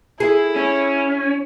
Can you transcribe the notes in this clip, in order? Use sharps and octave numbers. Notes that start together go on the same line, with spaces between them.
E4 G#4
C#4